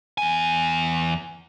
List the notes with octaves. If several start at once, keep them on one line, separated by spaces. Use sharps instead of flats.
E2 G#5